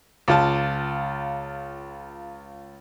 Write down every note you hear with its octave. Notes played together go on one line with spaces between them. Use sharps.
C#2 F4 A5